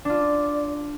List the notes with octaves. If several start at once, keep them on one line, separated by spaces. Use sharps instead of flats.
D4 F4 D5